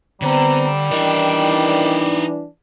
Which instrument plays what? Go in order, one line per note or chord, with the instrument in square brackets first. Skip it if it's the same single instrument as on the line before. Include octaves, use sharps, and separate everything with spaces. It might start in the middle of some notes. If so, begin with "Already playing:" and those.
[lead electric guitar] D3 [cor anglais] G3 [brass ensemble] B3 C4 A#5
[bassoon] D#3 [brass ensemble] E3 D4 [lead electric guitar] D#4 D5